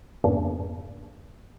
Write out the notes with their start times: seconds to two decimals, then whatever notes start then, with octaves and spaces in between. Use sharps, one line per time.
0.24 F2 G#2 C#3 A#3 B3 D4